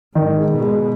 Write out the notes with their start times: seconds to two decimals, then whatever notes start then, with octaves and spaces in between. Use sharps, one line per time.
0.15 G#2 D#3
0.38 G#3
0.50 B2
0.62 G#3